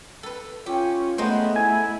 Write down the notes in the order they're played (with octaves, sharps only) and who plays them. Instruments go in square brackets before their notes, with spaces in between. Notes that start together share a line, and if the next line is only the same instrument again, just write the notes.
[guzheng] A4 B4
[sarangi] C#4 [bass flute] F4 [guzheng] G4
[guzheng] G#3 D#4 C5 [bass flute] A3 [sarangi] B3
[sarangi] E4 [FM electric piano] G#5